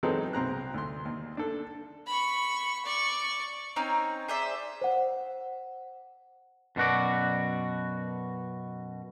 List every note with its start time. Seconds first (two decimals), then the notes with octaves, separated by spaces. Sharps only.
0.03 E3 F#3 G#3 C4 D#4 A4
0.33 C2 C4 A#5 F#6
0.74 D2 C6
1.05 D#2
1.37 D4 A4
2.07 B5 C#6
2.85 D5 C#6
3.76 C4 C#4 D#4 C#5
4.28 G#4 C5 D5 E5
4.81 C5 F#5
6.76 F#2 B2 F#4 D5